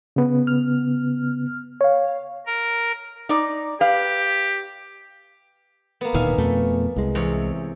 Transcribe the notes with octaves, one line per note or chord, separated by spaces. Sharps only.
C#3 B3
F6
C#5 F5
A#4
D#4 D5
G4 B4 F5
A#3 B3
D1 A#2 D#3 E5 F5 G#5
F2 B2 A3
C2 G#3
E2 C3 C#5